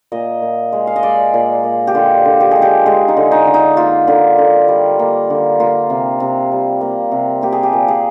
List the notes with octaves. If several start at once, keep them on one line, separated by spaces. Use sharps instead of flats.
A#2 D#5
A#2
G#3
F5
D#5
G#3 D5
A#2
A#2
G4
D3 F4
D3
G4
G#3 G#4
G4
G#3 G#4
D#4
D3
D#4
D3
D#4
A#3 F4
D3
D3
G3
A#3
D3
A#3 F4
C3
C3
G3
A#3
C3
A#3 G4
G#4
G4
A#2
G#4